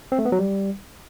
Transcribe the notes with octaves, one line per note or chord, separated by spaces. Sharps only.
C4
A3
B3
F#3
G3